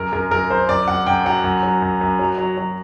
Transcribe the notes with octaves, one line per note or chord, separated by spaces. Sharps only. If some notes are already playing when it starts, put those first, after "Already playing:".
Already playing: F#2 A#4
F#2 A#4
F#2 A#4
F#2 C5
F#2 D5
F#2 F#5
F#2 G5
F#3 F#5
F#2
F#3
F#2
F#2
F#3
F#3
F#3